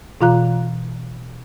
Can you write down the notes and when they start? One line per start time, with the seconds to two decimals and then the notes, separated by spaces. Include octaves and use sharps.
0.21 B2 E3 F4 F5 A#5 F#6